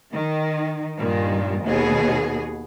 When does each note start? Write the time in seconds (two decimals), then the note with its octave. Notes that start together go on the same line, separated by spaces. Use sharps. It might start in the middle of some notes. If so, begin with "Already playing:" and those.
0.13 D#3
0.99 G2 A#2 D#3
1.64 D#2 B2 B3 G#4